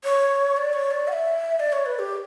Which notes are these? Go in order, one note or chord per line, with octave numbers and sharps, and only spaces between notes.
C#5
D5
C#5
D5
F#5
E5
D5
C#5
B4
G4